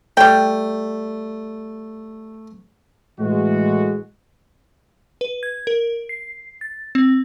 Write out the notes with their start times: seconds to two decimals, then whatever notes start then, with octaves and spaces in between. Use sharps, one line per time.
0.17 G3 A3 G5
3.19 A2 E3 G#3 F#4
5.21 B4
5.43 G#6
5.67 A#4
6.09 C7
6.61 A6
6.95 C4